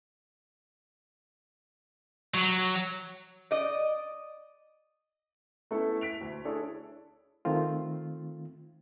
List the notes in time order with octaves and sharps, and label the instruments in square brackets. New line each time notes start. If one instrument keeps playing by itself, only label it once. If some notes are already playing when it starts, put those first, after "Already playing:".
[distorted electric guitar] F#3
[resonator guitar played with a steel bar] D5 D#5
[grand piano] A3 B3 C#4 E4 A4
B6 D7 F7
D2
D4 E4 G#4 A4 C#5
[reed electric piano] D#3 A3 C4 F4